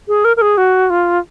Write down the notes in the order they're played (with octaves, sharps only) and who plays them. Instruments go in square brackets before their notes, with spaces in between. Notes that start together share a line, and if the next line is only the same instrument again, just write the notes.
[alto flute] G#4
A#4
A#4
G#4
F#4
F4